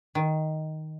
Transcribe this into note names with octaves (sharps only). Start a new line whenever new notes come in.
D#3